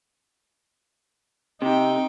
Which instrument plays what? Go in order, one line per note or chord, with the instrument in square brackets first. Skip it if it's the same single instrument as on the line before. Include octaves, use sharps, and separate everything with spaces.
[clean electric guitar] C3 [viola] D#4 G5